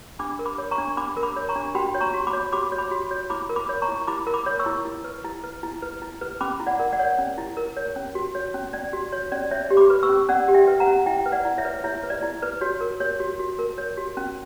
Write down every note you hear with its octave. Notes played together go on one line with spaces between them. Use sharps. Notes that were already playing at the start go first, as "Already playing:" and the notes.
D4 B5 D6
A#4
B5 D6
C#5
A#5 C#6
D4
D4 B5 D6
A#4
B5 D6
C#5
A#5 C#6
D4
F#4 G5 B5
C#5
A#5 C#6
F#4
B5 D6
C#5
F#4 B5 D6
C#5
B5 D6
F#4
C#5
E4 B5 D6
A#4
B5 D6
C#5
A#5 C#6
E4
E4 B5 D6
A#4
B5 D6
C#5
C#6 E6
E4
E4
B4
E4
B4
E4
B4
E4
B4
C#4 B5 D6
E4
D5 F#5
A#4
D5 F#5
C#5
C#4
E4
A#4
C#5
C#4
F#4
C#5
C#4
C#4 D5
F#4
C#5
C#4 D5
C#4 C#5 E5
G4
B5 D6
B4
C#6 E6
C#4
C#4 D5 F#5
G4
E5 G5
B4
F#5 A#5
C#4
E4 E5 G5
B4
D5 F#5
E4
C#5 E5
B4
E4 C#5 E5
B4
D5
E4
B4
F#4 C#5
A#4
C#5
F#4
F#4
A#4
C#5
F#4
C#4